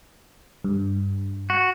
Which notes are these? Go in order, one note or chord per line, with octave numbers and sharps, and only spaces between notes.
G2
F#4